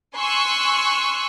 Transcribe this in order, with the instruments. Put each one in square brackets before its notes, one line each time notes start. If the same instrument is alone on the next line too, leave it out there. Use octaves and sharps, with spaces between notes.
[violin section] G#5 C6 C#6 E6 F#6